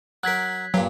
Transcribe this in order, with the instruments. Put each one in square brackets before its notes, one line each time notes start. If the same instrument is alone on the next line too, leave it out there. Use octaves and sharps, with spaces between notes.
[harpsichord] F#3 A#4 [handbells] F#6 G#6 B6
[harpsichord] G2 A#2 [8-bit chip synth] F#3